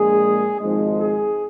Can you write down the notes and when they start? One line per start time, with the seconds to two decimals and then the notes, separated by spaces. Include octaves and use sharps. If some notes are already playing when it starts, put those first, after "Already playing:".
Already playing: A#1 A#2 G#3 G#4
0.60 G#1 G#2 F3 G#3
0.97 G#4